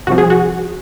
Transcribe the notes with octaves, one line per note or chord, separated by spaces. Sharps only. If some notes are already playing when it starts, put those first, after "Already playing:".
C2 C3 F3 F#4
G#4
F#4